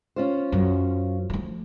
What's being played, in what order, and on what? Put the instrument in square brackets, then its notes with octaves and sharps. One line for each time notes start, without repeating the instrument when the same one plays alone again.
[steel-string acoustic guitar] C#4 F4 C5
[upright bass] F#2 F#3
F3 A3